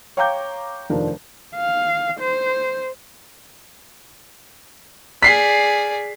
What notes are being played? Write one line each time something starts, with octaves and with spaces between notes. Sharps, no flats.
C#5 F5 G5 A#5 D6 G6
F1 D#3 F3 D4 A#4
F5
C5
G#4 D5 B6 C7